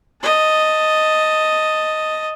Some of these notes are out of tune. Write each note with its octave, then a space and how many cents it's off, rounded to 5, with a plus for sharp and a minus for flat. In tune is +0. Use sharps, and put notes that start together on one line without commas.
D#5 +0 A5 +10